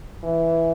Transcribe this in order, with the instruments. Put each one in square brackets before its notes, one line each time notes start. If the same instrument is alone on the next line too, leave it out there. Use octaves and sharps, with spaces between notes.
[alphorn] E3